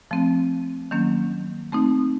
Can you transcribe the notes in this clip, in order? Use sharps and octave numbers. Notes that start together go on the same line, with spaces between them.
F3 A3 C4
D#3 F#3 A#3 C#4
A3 C4 D#4